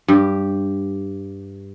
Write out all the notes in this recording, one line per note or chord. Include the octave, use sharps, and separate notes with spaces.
G2 G4